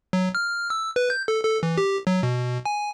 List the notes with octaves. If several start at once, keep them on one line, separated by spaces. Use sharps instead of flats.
F#3
F6
E6
B4
G6
A4
A4
E3
G4
F#3
B2
G#5